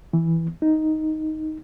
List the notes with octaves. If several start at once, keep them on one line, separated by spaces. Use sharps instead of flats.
E3
D#4